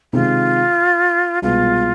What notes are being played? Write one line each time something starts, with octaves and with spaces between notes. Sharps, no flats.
C3 D#3 G#3 F4
C2 B2 G#3 B3 F4